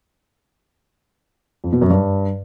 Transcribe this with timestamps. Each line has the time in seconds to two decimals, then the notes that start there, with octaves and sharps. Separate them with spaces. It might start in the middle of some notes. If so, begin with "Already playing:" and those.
1.64 F2
1.73 B2
1.81 F#2
1.90 G2